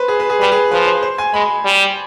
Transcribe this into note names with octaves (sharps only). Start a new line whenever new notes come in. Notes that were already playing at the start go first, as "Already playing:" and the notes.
Already playing: B4 C5
G#4
B4
G#4
G3 B4
G#4
F3 B4
C5
C5
G#5
G#3 B5
G3